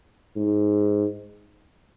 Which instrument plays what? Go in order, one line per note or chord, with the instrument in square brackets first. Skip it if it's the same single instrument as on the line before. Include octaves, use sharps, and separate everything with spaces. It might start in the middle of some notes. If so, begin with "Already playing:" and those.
[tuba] G#2